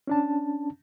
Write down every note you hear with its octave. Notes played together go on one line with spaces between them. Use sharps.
C#4 D4 A5